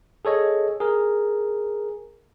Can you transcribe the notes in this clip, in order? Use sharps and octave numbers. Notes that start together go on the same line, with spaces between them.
G#4 A4 C#5 D#5
G#4 A#4